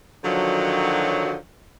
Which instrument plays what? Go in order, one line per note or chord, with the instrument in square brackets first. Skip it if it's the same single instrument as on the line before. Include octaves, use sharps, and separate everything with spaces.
[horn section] D3 D#3 F3 F#3